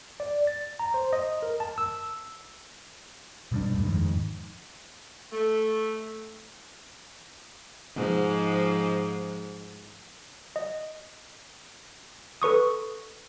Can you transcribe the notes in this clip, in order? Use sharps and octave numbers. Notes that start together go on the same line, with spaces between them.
D5
A6
A#5
C5
D#5
A#4
A5
E6
B2 G3 D4
D1 A#1 G2 A3
F2 G#2 D#3
A3
G#2 F3
D#5
A4 B4 C#6 D#6